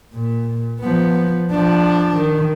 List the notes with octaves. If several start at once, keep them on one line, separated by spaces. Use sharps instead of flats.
A#2
F3 B3
F3 D4
D#3